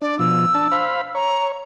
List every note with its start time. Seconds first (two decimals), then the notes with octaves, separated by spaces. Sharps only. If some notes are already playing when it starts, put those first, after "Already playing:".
0.02 D4 D5
0.19 B2 F3 E6
0.54 D4 A5
0.72 C5 F5 B5
1.15 C#5 A#5